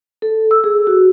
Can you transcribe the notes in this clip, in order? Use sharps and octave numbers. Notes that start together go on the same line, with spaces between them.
A4
E6
G#4
F#4